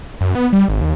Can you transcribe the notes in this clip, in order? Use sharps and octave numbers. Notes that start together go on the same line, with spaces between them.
F#2
B3
G3
G#1
D#2